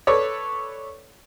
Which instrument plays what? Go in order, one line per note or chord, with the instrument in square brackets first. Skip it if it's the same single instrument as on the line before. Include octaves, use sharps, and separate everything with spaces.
[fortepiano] A4 B4 C#5 D5